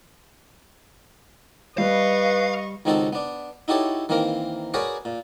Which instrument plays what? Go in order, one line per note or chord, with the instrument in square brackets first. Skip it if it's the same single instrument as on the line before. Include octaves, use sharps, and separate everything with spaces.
[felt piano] G3 [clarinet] B4 [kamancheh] D#5 C#6 [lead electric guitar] F5
[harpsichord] C#2 D#3 C4 D#4 F#4 A4
B3 D4
D#4 E4 F#4 G4 A4 C#5
D#3 E3 A#3 C4 A#4
F#4 G#4 A#4 B4 C#5 D5
A#2